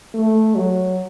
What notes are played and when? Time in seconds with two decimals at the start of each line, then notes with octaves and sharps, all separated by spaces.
0.14 A3
0.55 F#3